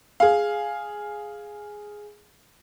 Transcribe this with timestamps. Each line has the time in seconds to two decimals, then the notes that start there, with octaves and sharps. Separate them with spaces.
0.20 G#4 F5